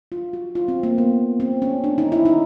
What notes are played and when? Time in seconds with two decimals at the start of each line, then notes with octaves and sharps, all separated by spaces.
0.12 F4
0.33 F#4
0.55 F4
0.68 C4
0.83 A#3
0.98 B3
1.40 C4
1.62 C#4
1.84 D4
1.98 D#4
2.12 E4
2.25 D#4